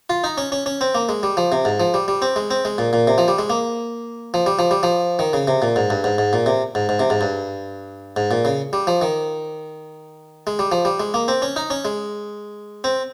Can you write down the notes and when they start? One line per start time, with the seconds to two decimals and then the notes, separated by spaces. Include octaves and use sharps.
0.10 F4
0.24 D#4
0.38 C#4
0.52 C#4
0.66 C#4
0.81 C4
0.95 A#3
1.09 G#3
1.23 G3
1.37 F3
1.52 C3
1.65 G#2
1.80 F3
1.94 G3
2.08 G3
2.22 C4
2.36 G#3
2.51 C4
2.65 G#3
2.78 A#2
2.93 A#2
3.08 C3
3.18 F3
3.28 G3
3.39 G#3
3.50 A#3
4.34 F3
4.46 G3
4.59 F3
4.71 G3
4.83 F3
5.19 D#3
5.33 C#3
5.48 C3
5.62 A#2
5.76 G#2
5.90 G2
6.04 G#2
6.18 G#2
6.33 A#2
6.46 C3
6.75 G#2
6.89 G#2
7.00 C3
7.10 G#2
7.21 G2
8.17 G#2
8.31 A#2
8.45 C#3
8.73 G3
8.87 F3
9.02 D#3
10.47 G#3
10.59 G3
10.72 F3
10.85 G3
11.00 G#3
11.14 A#3
11.28 C4
11.42 C#4
11.56 D#4
11.70 C#4
11.85 G#3
12.84 C4